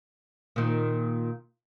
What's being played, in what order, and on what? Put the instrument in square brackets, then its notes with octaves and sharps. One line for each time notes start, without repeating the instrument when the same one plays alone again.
[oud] A#2 D#3